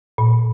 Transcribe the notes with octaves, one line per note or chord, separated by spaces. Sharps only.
A#2